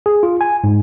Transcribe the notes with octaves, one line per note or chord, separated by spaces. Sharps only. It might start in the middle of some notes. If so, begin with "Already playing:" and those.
G#4
F4
G#5
G#2